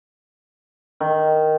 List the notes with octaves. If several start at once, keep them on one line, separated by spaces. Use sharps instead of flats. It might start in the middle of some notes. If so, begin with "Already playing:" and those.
D#3